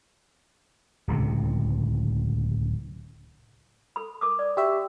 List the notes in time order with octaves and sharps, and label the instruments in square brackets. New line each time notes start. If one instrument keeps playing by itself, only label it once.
[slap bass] D1 C#2 C3
[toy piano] A4 B5
A#4 D6 D#6
D5
[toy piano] F#4 C#6 [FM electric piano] G4 E5